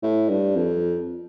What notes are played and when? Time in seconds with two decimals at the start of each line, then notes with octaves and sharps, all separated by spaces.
0.03 A2
0.29 G2
0.56 F2